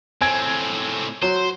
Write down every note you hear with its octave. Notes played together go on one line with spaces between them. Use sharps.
A2 C4 G#5 G#6 D7
F#3 C5